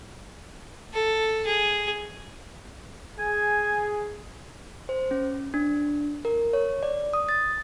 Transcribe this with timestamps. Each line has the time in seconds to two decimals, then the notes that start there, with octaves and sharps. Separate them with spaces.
0.94 A4
1.46 G#4
3.19 G#4 G#5
4.89 C5
5.11 C#4
5.54 D4
6.25 A#4
6.53 C#5
6.83 D5
7.13 D#6
7.29 A6